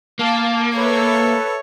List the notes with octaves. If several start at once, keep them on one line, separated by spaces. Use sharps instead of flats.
A#3 F5 A5
A4 B4 C#5 E5